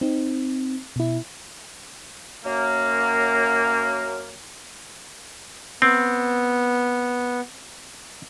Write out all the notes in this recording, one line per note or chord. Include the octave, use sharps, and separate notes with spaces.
C4 D#4
B2 E4
F#2 A#3
B3 C4